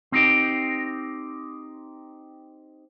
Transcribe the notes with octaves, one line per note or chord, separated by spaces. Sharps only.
C4 D#4 G4 D#5